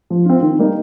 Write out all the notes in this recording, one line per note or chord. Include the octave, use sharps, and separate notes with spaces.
F3
C4 F4
D#3
G3 A#3 D#4